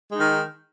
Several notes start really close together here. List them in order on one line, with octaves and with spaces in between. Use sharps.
G#3 D#4 D#3